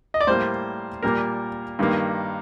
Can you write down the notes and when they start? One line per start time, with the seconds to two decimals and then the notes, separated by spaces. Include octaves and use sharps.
0.14 D#5
0.21 D5
0.27 A2 G3 A#3 C5
1.03 A#2 G3 A#3 A#4
1.79 G2 D#3 G3 A#3